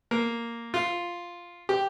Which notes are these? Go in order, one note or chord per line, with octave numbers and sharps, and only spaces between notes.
A#3
F4
G4